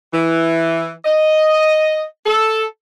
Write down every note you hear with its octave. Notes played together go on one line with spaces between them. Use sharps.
E3
D#5
A4